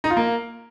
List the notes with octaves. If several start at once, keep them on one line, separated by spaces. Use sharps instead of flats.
D#4
F4
A#3